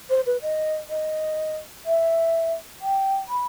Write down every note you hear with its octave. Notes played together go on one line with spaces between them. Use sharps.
C5
B4
D#5
D#5
E5
G5
B5